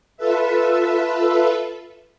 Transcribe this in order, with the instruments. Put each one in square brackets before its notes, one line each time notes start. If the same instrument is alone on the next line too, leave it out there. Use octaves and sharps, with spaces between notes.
[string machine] F4 A4 B4 E5